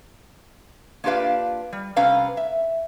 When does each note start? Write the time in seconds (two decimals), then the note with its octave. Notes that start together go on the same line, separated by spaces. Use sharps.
1.04 A#3 D4 F4 G4 B4 F5
1.73 G3
1.96 C3 G3 C#4 B4 F5 A#5
2.37 E5